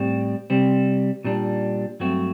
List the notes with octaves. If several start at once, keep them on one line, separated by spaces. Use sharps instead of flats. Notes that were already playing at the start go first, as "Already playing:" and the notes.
Already playing: A2 G3 C4
C3 G3 C4
A#2 G3 D4
G2 F#3 A3 C4 F#4